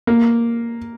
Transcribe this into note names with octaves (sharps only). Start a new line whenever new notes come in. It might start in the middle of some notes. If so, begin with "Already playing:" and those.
A#3